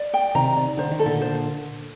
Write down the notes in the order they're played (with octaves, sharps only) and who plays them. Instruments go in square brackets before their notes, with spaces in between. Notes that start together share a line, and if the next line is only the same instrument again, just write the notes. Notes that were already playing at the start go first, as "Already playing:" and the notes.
Already playing: [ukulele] D5
G5
[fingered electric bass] C3 D#3 [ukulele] A#5
[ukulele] D5
[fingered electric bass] D3 [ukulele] C5
[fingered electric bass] D#3
[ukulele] A4
[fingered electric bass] A#2 D3
[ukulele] C5